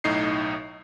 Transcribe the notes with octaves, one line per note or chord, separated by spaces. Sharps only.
B1 A2 D#4 C7